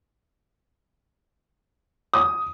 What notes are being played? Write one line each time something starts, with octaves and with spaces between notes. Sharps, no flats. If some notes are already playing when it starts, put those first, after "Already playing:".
D#6